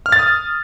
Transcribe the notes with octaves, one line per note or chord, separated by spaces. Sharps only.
F6
A6
D#6